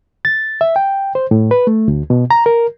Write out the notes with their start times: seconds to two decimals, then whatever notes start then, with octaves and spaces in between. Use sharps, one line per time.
0.25 A6
0.61 E5
0.76 G5
1.15 C5
1.31 A2
1.51 B4
1.67 A3
1.88 D2
2.10 B2
2.31 A#5
2.46 A#4